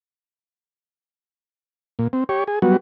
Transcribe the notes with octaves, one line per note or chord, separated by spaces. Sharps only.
A#2
C4
G4 C#5
G#4
F#3 G3 B3 F#4